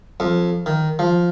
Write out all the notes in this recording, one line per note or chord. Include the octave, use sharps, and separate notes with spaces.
F2
D#3
F3